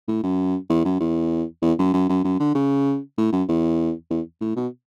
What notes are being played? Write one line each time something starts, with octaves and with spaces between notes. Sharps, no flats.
A2
F#2
E2
F#2
E2
E2
F#2
F#2
F#2
F#2
D3
C#3
A2
F#2
E2
E2
A2
B2